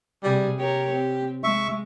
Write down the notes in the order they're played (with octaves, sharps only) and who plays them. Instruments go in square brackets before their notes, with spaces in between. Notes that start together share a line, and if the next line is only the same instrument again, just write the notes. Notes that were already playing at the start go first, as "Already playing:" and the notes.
[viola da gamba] C3 G#4 [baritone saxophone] G3
[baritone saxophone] G4 [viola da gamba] A#4 C#5
[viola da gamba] C4
[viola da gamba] G#3 [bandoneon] E5 C#6